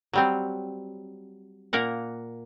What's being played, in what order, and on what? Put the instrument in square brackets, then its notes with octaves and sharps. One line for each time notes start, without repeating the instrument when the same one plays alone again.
[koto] F#3 G3 C4
A#2 A#3 A#4 F#5